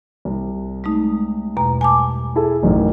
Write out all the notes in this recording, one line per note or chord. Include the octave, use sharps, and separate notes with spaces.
C2
G#3 A3 D#4
E2 B2 A#5
G#5 A5 D6
E4 G#4 A4
A1 F#2 D#3